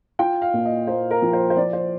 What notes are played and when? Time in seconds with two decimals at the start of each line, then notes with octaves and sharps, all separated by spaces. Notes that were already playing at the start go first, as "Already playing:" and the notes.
0.19 F4 G5
0.42 F5
0.54 A#2
0.65 D#5
0.87 A#3 C5
1.11 A#4
1.22 F3
1.33 C5
1.50 C5
1.56 F3 D5
1.73 C5